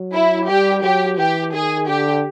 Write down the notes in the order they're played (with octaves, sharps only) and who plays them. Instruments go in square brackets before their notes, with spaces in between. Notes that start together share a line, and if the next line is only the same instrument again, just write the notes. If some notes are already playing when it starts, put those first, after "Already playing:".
Already playing: [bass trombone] F#3
[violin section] E4
[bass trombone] G3 [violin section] G4
[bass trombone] F#3 [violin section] G4
[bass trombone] E3 [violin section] G4
[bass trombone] D#3 [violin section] G#4
[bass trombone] D3 [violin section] G4